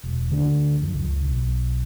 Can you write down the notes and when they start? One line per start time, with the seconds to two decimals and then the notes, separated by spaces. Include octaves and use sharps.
0.04 E1
0.29 D2 D3 B3 D4
0.81 F#2 F3
0.94 C#2
1.25 B1